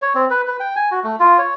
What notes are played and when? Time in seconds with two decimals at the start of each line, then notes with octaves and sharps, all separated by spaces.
0.02 C#5
0.15 C4
0.30 B4
0.48 B4
0.60 G5
0.76 G#5
0.91 F#4
1.04 A3
1.20 F4
1.38 C#5